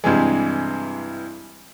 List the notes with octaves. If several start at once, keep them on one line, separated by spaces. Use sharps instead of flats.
G2 C3 E3 G#3